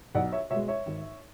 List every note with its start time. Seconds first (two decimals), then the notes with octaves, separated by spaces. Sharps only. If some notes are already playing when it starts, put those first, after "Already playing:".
0.15 B1 D5 F#5
0.32 C#5 E5
0.50 B2 C#5 E5
0.55 G#3
0.68 C#5 E5
0.86 G#1